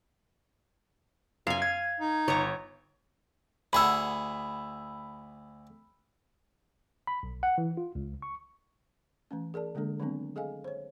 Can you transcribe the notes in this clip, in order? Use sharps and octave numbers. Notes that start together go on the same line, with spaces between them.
F#2 F5 G#5
G#6
D#4
G1 C#5 A#5
D2 G#4 F#5 B5 E6
B5
B1
F#5
E3
F4
C#2
C#6
E3 A3 C#4
G#4 A#4 D5 A5
D3 G#3 A#3 D4 A4
D#3 F#3 A3 B3 C4 D4
G#4 A4 D#5 F5 G#5
C5 C#5